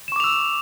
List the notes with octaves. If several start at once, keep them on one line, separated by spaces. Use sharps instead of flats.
C#6 D6 E6 E7 F7